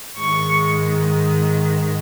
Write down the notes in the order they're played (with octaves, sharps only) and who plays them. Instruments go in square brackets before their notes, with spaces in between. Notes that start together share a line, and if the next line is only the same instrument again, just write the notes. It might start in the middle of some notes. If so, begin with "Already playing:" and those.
[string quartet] G#2 D#3 G#3 C#6